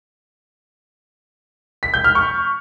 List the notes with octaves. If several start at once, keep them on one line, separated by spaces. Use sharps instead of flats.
B6
G6
F6
C#6